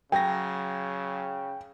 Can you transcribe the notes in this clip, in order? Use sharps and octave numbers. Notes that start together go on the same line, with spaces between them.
C#3 F#3 G5 A#6